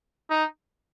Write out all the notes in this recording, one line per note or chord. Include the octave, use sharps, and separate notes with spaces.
D#4